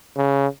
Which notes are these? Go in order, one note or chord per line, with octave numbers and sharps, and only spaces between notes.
C#3